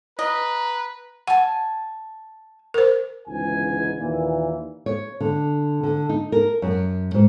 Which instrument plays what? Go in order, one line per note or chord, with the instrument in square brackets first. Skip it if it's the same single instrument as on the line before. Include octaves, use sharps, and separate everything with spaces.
[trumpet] B4 [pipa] D#5 [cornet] A#5
[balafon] F#5 [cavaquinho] G#5 A5
[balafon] A#4 C5
[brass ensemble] G1 C#2 G#2 E3 D#4 G#5
D#2 A#2 E3
[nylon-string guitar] C#5
D3
D3
D#4
A#4
F#2
G#2